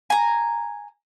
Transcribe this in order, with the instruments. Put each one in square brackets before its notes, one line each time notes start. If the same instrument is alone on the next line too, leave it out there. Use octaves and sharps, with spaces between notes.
[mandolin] G#5 A#5